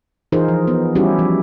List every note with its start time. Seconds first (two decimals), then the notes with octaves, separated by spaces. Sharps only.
0.32 E3 D#4 F4 G#4 A#4 C5
0.48 F3
0.67 B3
0.95 G3 C#4 E4 F#4 G4
1.19 F3